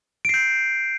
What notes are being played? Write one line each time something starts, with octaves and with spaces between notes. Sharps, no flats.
G6 C7 D7